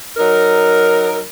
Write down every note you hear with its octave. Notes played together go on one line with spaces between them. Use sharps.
F#3 D#4 A#4